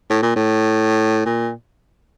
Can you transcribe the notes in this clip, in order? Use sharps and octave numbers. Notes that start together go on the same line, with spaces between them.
A2
A#2
A2
A#2